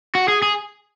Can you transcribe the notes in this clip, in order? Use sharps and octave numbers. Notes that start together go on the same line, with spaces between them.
F#4
G#4
G#4